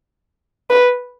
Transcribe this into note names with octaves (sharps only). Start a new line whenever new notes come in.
B4